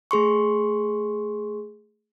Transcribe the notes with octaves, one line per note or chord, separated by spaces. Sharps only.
A3 G#4 C6 C#6